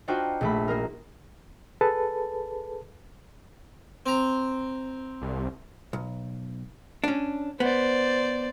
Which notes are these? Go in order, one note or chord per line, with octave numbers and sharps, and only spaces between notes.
D4 D#4 F4 F#4 C5 G5
A#1 A3 B5
A#3 D#4 A#4
G#4 A4 B4 A5
C4 A#5
C2
B1
C#4 D4
B3 C5 D5